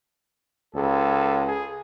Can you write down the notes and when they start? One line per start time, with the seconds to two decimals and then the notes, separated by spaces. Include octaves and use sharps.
0.75 C#2 A4
1.47 G#4